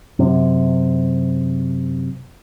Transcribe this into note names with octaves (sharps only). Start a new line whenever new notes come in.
F#2 C3